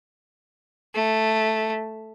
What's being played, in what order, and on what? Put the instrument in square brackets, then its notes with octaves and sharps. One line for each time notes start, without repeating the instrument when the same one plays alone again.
[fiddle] A3